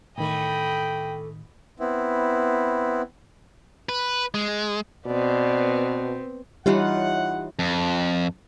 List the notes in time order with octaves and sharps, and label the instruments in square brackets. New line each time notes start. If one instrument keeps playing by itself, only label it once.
[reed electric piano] A2 D#3 [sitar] E3 A3 [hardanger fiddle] D#5 B5 [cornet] G5
[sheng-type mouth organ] B3 C4 E4
[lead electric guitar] B4
G#3
[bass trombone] B2 [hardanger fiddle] B3 C4 [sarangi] D5
[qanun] E3 D#4 F4 [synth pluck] G3 [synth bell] G4 C#5 E5 [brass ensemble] F#5
[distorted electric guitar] F2